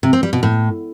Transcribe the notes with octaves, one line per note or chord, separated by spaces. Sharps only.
C3
C4
G3
B2
A2